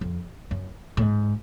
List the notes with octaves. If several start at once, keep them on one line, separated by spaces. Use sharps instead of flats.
F2
F#2
A2
G#2